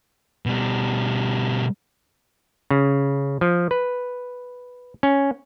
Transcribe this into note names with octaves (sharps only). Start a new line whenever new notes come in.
B2 G3
C#3
F3
B4
C#4